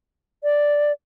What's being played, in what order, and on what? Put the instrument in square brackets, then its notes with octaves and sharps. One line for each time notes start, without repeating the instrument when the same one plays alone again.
[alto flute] D5